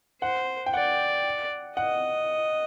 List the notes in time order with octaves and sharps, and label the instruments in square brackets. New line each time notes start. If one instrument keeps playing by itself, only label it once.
[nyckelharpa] C5 [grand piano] F#5
[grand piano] G5
[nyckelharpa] D5 [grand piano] F#5
[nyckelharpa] D#5 [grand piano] F#5